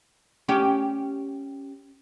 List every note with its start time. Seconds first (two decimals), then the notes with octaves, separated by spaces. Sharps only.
0.48 C#4 G4